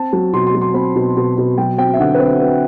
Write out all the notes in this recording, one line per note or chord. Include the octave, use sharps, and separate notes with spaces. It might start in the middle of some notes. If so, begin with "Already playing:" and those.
Already playing: C4 A5
F#3
B2 C6
C6
F#3
C6
C4 B5
B2
B2
B2
F#3 G5
C4 G5
E5
D3 F#5
B4
C4 C5
C4 B4